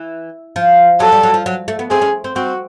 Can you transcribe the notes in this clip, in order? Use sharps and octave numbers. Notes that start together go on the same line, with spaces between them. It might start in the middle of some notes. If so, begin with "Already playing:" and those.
Already playing: E3
F3
F#3 A4
G3
F#3
F3
F#3
A3
B3
C4 G#4
C#4
C4
C4 F#4